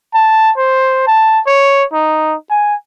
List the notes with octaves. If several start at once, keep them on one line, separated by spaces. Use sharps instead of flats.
A5
C5
A5
C#5
D#4
G#5